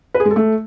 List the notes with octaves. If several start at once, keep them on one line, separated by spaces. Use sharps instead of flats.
B4
G#4
G#3
A4
A3